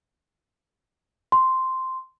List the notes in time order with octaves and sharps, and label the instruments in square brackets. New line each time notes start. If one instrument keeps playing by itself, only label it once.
[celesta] C6